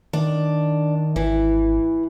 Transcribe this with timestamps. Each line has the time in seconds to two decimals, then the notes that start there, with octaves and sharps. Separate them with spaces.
0.13 D#3 D4
1.16 G#1 E3